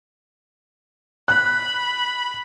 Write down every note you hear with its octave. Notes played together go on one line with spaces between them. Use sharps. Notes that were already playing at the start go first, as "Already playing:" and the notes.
B5 F#6